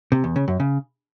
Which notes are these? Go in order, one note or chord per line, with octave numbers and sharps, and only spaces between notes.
C3
E2
C#3
F#2
C#3